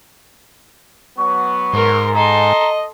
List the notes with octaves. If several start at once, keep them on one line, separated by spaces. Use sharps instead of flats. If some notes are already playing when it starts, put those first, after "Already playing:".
F#3 B3 C#6
G#2 A#4 C6
A4 D#5 A#5 C6